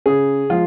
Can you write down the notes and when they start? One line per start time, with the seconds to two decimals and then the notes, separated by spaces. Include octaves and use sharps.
0.06 C#3 G#4
0.50 F3 G#3 F4